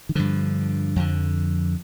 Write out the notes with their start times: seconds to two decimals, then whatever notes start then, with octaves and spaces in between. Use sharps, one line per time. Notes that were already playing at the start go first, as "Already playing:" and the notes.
0.09 D#3
0.15 G2 D3 F3
0.96 F2 D3